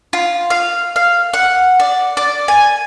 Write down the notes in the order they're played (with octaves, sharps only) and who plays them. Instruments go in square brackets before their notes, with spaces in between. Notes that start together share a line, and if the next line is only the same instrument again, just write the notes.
[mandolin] F4
F5
F5
F#5
D5
D5
G#5